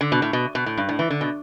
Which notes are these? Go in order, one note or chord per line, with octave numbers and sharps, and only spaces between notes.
D3
B2
A2
B2
B2
A2
G2
A2
E3
D3
B2